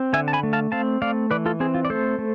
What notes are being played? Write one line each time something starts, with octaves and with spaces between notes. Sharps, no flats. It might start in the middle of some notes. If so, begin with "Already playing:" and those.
Already playing: C4
D3 E5 G#5
A5
G#5 B5
A3
F5 A5
C4 F5 A5
A3 D5 F5
E3 B4 D5
F4 A4
C4 G#4
F4
D5
A3 A4 C5
A3